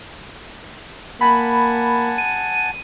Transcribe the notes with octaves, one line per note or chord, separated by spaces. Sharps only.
A#3 F#5 G#5 A5 B5
D#7